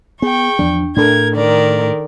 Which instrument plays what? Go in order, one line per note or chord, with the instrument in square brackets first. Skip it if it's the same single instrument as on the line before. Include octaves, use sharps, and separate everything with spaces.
[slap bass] B3 [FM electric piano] G#4 [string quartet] G5 C#6
[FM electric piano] E2 D4 [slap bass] F3
[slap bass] A2 [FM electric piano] D4 A4 [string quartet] A#4 G#6
[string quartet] D#3 A#4 D5